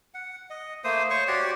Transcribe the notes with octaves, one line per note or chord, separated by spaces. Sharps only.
F#5
D#5
A3 A#3 C5 D#6
C5 C#5 C#6
F#4 G4 C#5 D5